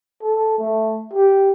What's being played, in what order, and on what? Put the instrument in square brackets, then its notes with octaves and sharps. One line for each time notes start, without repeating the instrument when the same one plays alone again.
[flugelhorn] A4
A3
G4